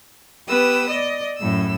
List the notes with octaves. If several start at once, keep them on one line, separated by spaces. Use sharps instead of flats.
B3 G4 B4 D#6 E6
D5 D#5
F#2 A2 E6